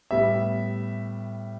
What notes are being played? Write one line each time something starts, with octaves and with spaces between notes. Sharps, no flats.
A2 G3 B3 E5